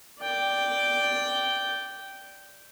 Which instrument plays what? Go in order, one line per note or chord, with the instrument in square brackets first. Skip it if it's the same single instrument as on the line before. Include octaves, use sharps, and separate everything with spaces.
[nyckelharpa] D5 G5